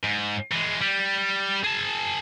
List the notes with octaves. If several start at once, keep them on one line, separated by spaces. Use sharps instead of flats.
G#2
E3 G#3
G3
G#4 A5